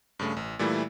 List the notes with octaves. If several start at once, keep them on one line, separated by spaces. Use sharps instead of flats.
G2 C#3 A3
A1
A#2 E3 G3 A3 E4